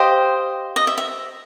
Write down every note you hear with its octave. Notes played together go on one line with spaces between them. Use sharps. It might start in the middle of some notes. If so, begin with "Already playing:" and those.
Already playing: G4 C5 D#5 F5
D#5
E5
E5